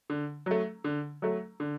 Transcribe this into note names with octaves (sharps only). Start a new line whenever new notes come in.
D3
F#3 A3
D3
F#3 A3
D3